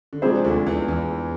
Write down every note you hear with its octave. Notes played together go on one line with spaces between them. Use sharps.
D3
C3 F3 G#3 D4 G#4 C5
D2 D3
E2 E3
E2 E3